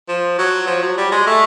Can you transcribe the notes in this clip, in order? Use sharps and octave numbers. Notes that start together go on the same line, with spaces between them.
F3
F#3
F3
F#3
G3
G#3
A3